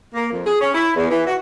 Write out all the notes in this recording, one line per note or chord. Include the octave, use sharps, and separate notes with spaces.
A#3
F2
G#4
C#4
E4
E2
E3
F#4